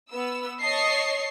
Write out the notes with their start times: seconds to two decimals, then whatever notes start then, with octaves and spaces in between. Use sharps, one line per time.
0.11 B3 E6
0.60 C#5 D#5 A5 C#6 D#6 C7